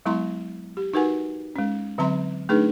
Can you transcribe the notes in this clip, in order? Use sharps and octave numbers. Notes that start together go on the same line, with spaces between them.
F#3 G#3 B3 E4 A#5 C6
G4
D#4 F#4 A#4 B4 F#5 G#5
G#3 C#4
D3 F#3 C4 E5 A#5 C6
A3 D4 D#4 G#4 B4